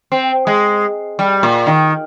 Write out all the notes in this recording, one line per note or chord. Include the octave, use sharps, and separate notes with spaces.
C4
G#3
G3
A#2
D#3